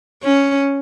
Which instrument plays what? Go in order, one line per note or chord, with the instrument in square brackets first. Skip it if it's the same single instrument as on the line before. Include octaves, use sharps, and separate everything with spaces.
[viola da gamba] C#4